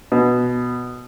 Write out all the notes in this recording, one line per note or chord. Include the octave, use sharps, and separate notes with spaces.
B2